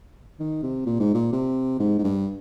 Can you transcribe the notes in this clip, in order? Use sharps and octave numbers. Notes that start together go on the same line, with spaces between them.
D#3
C3
A#2
G#2
A#2
C3
G#2
G#2
G2